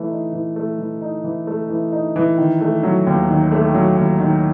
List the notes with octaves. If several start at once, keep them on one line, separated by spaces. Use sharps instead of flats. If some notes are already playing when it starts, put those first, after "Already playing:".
Already playing: E3 A3
D#4
E3
A3
E3
D#4
E3
A3
E3
D#4
E3
D#3
A3
F#3
D#2
D#3
A3
F#3
D#2
D#3